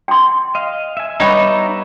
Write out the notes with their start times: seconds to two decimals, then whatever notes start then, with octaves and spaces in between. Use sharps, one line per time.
0.08 G5 C6
0.55 D#5 F5
0.97 E5 G#5
1.20 G3 B3 D#4 C#5 E5